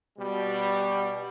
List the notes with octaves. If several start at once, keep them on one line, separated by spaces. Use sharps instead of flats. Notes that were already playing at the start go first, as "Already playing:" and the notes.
B2 G3